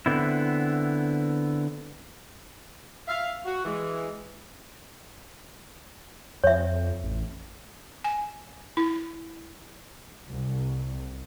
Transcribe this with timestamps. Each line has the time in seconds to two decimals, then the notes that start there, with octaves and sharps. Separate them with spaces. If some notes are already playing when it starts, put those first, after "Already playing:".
0.06 D3 B3 C4 E4
3.08 E5 F5
3.45 F#4
3.65 E3 G#3
6.44 F2 C#5 E5
7.04 A1
8.04 G#5
8.77 E4
10.30 C2